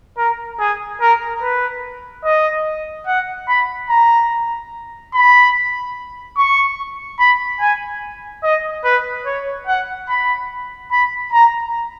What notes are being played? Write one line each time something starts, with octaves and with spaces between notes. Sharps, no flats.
A#4
G#4
A#4
B4
D#5
F#5
B5
A#5
B5
C#6
B5
G#5
D#5
B4
C#5
F#5
B5
B5
A#5